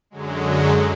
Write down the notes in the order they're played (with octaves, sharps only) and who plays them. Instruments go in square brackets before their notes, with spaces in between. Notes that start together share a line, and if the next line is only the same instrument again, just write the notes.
[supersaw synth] F#2 D3 F#3 G#3